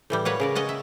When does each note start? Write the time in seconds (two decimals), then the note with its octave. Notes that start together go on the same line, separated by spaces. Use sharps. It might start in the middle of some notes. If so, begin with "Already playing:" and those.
0.10 A2 E3 G3
0.25 A#3 B4 C#5 F#5
0.40 C#3 A#4 D5
0.55 C#4 D#5 F#5 A5
0.69 E5